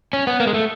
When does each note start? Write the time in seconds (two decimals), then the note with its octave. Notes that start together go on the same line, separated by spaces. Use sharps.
0.13 C#4
0.27 B3
0.40 A#3
0.47 G#3
0.54 A3